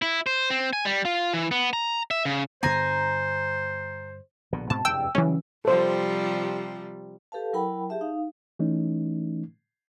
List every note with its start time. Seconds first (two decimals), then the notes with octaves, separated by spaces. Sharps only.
0.02 E4
0.26 C5
0.50 C4
0.73 G#5
0.85 G3
1.05 F4
1.33 E3
1.51 B3
1.73 A#5
2.11 E5
2.25 C#3
2.63 G2 D3 B3 C5 G#5 A#5
4.53 A#1 B2 D3
4.70 G#2 B2 C4 A5
4.85 F1 E2 G2 G5 E6
5.15 C#3 E3 F#3 G3 C#4
5.65 C3 F3 G3 A4 C5
7.32 G4 A4 B4 F5 A5
7.53 F#3 E4 A#4 F#5 G5 B5
7.89 G4 G#4 E5 A5
8.01 D#4 F5
8.59 E3 A3 C#4 D#4